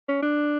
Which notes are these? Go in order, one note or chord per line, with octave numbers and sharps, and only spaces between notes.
C#4
D4